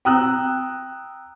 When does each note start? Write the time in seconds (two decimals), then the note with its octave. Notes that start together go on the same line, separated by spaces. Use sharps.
0.05 G5 A#5 D#6 E6 F#6